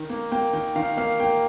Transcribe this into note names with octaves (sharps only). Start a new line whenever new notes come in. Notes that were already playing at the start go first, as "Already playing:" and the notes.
Already playing: D#3
A#3
A#3 G5
D#3 G5
D#3 F5
A#3 F5
A#3 G5